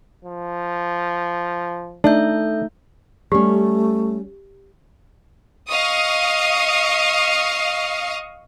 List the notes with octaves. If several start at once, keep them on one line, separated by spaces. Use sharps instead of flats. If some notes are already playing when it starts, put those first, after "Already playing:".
F3
A3 D4 D#4 A4 E5 G6
G3 A3 C#4 G4
D#5 F5 C#6 D#6